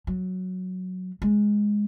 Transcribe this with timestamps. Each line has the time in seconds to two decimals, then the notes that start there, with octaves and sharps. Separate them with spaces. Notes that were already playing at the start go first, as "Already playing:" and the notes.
0.07 F#3
1.22 G#3